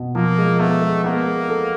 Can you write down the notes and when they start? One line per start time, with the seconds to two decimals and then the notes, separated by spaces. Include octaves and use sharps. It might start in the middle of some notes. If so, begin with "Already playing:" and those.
Already playing: B2
0.15 F3 A#3
0.38 G#3
0.60 A3 B3
0.81 G#3
1.04 A#3 B3
1.26 G#3
1.49 A4